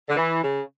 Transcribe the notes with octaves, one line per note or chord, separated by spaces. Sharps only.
D3
E3
C#3